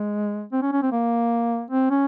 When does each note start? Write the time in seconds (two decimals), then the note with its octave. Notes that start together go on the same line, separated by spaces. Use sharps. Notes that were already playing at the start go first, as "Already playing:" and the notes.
Already playing: G#3
0.53 C4
0.62 C#4
0.73 C#4
0.82 C4
0.92 A#3
1.71 C4
1.90 C#4